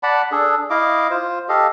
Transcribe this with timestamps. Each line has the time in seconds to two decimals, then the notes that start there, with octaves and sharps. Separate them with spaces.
0.03 D5 F#5 A5 B5
0.32 D4 G#4 A4
0.70 E4 D#5 F5 D6
1.11 F4 C5
1.49 G4 A4 D#5 F5